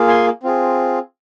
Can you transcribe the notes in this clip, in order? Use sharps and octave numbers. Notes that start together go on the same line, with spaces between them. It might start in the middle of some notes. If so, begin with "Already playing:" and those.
Already playing: A#3 F4 G#4
G#5 C6
C4 F4 G#4